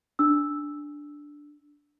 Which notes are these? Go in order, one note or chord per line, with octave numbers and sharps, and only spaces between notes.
D4 E6